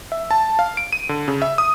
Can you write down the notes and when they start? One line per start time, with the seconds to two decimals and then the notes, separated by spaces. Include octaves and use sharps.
0.12 E5
0.31 A5
0.59 F5
0.77 D7
0.93 D#7
1.09 D3
1.28 C#3
1.42 E5
1.58 D#6